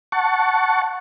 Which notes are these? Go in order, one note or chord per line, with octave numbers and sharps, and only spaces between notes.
F#5 A5 C#6